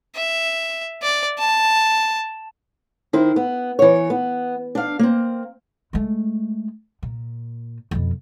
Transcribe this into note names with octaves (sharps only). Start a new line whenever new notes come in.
E5
D5
A5
D#3 E4 C5
B3
E3 C#5
B3
D4 F5
A#3 C4
G#3 A3
A#2
F2 B2